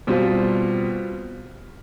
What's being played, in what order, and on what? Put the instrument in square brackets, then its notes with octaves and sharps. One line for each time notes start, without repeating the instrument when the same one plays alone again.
[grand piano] B2 G3 C4 F4